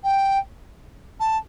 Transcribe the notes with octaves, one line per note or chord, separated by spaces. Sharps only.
G5
A5